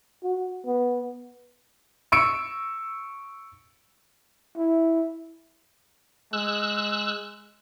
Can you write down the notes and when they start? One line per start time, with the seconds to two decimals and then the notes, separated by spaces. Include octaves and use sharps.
0.24 F#4
0.66 B3
2.12 C#6 E6 C#7 D7
4.57 E4
6.33 G#3 E6 F#6